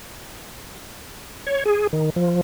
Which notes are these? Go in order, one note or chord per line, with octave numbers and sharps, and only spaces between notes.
C#5
G#4
D#3
F3